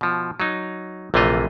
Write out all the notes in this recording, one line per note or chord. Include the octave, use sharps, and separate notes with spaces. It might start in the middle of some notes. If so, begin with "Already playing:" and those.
B2 F3
F#3 D#4
A#1 C3 E3 A3 F4 D#5